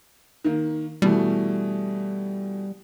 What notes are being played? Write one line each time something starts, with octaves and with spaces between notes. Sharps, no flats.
D#3 A#3
B2 E3 G3 A3